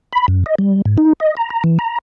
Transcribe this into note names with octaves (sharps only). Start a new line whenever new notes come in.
B5
F#2
D#5
G3
G#2
D#4
D#5
A#5
A#5
E3
A#5